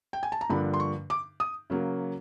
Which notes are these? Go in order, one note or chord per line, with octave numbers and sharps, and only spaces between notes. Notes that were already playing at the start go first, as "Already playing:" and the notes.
G5
G#5
A5
A#5
G2 D3 F3 A#3 D4 B5
C6
C#6
D6
D#6
C#3 F#3 A#3